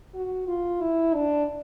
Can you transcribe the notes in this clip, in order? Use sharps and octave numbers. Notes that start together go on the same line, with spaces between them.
F#4
F4
E4
D4